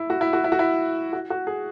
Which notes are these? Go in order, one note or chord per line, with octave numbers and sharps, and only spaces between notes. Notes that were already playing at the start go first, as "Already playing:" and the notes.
Already playing: E4
F#4
E4
F#4
E4
F#4
E4
F#4
F#4
G#4